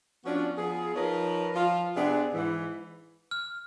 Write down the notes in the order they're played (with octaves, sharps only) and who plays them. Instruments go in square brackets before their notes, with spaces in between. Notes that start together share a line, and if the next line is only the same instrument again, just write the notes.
[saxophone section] F3 B3 C#4 D4 F#4
F3 B3 G#4
F3 D#4 A#4 B4 C#5
F3 F4
C3 B3 C4 D4 G#4
G#2 E3
[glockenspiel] F6